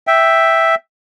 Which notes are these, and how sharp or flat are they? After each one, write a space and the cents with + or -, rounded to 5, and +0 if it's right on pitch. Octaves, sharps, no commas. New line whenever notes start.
E5 +0 G5 +0